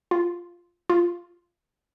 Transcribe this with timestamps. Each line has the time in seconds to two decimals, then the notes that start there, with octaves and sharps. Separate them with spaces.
0.11 F4
0.90 F4